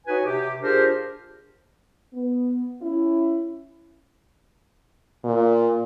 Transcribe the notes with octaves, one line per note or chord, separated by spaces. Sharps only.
D#4 F#4 B4 C#5 G#5
C3 G4
D4 F4 G4 G#4 A#4 C5
B3
C#4 E4
A#2